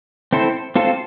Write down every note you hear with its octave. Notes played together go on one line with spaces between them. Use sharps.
C4 E4 A4 C5
C4 F4 A4 C5